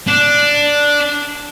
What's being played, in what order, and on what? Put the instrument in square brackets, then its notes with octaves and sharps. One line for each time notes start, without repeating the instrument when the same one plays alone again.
[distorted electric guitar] D4